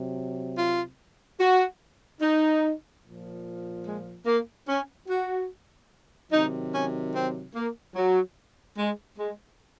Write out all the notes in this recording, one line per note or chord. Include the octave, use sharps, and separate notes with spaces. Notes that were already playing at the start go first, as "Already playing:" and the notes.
Already playing: C3 F#3
F4
F#4
D#4
A#2 F3
G#3
A#3
C#4
F#4
C3 D#3 F#3 D#4
C#4
C4
A#3
F#3
G#3
G#3